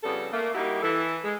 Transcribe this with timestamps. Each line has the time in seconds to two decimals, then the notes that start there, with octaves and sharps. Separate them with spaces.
0.04 F2 C#3 G3 B3 A4
0.32 A3 A#3
0.55 G3 A#3 D#4 E4 F#4 G4
0.82 E3 A4
1.24 G#3